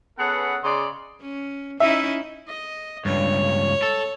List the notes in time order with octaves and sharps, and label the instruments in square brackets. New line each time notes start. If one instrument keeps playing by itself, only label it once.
[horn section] B3 C#4 G#4 A4 B4 F#5
C#3 D5 D#5 C6
[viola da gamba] C#4
[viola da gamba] C#4 D#4 E4 [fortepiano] E5
[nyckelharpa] D#5
[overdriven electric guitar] C#2 G2 [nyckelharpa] C#5
[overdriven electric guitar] A4